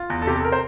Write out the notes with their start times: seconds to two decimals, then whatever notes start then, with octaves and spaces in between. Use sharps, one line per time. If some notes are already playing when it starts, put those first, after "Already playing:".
Already playing: F4
0.10 E2
0.22 A4
0.27 C3 G4
0.35 A4
0.45 A#4
0.52 C5